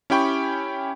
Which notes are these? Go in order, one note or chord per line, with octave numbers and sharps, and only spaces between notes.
C#4 E4 G4 G5 B5 C#6